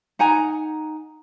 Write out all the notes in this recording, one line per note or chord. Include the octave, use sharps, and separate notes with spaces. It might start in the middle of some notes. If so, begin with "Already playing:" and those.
D#4 F#5 G#5 A#5